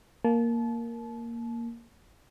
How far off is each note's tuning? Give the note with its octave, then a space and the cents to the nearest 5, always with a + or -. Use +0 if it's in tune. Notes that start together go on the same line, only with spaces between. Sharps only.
A#3 +0 A5 -30